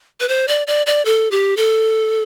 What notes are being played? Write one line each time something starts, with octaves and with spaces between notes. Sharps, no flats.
B4
C5
D5
D5
D5
A4
G4
A4